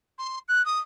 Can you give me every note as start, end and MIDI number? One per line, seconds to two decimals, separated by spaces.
0.18 0.39 84
0.48 0.64 90
0.65 0.80 87